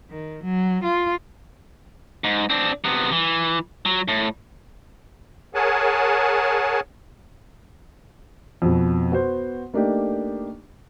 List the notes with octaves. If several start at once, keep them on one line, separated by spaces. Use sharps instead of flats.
D#3
F#3
F4
G#2
C4 D4
C3 B3
E3
F#3
A2
G#4 A#4 C#5 F#5 G#5 A5
F2 B2
B3 F#4 C5
A3 A#3 D4 D#4 G4